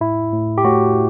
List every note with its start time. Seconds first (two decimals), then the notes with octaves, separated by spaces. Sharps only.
0.01 A2 E4
0.33 A2
0.58 G4
0.64 A2 F#4